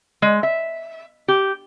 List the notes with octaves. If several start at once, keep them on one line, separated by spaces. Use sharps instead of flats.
G#3
E5
G4